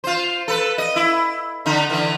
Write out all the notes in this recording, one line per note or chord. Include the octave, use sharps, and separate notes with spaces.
F4 C5
A4 B4
D#5
E4
D3 D#4
D3 E3